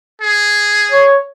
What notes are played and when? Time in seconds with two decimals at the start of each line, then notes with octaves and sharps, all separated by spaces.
0.21 G#4
0.91 C#5